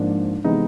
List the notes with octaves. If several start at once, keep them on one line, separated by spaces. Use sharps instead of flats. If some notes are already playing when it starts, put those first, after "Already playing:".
Already playing: G#2 F3 A#3 D4
C3 E3 G#3 B3 D#4